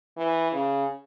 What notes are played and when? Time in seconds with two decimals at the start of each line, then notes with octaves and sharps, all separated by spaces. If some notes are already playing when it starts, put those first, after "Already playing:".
0.17 E3
0.52 C#3